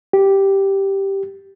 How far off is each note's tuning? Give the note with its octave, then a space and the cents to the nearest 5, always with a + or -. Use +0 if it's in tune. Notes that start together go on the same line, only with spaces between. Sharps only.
G4 -5